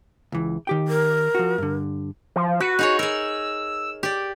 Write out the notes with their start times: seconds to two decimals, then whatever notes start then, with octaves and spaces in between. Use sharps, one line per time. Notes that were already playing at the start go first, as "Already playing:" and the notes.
0.32 C#2 E3
0.67 D#3 G4 G5
0.88 A#4
1.35 F3 F#4
1.58 G2 D3
2.36 F3
2.60 F#4 B4
2.79 D#4 G#4 C#5
2.99 G#4 A#4 E6
4.03 G4 D5